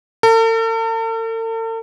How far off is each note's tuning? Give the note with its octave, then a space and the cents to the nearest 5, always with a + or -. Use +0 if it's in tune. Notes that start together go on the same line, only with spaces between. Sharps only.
A4 +45